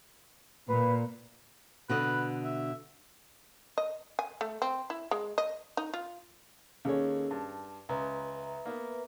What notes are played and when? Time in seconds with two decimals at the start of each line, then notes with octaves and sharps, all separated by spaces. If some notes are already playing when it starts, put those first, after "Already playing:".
0.69 A#2 B4
1.89 B2 D3 B4 D#5
2.44 E5
3.78 D#5
4.19 G#5
4.41 A3
4.62 C4
4.90 E4
5.11 G#3
5.38 D#5
5.77 D#4
5.94 F4
6.85 D#2 C#4 G#4 A4 C#5
7.31 G2 A5
7.89 C#2 B4 E5 A#5
8.66 A#3 B3